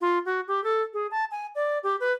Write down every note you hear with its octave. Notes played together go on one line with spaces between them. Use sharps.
F4
F#4
G4
A4
G#4
A5
G#5
D5
G4
B4